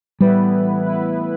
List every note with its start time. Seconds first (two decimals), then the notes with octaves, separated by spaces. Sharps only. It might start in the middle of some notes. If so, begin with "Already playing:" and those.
0.20 A2 E3 G3 B3 E4 B4
0.86 A2 E3 B3 E4 B4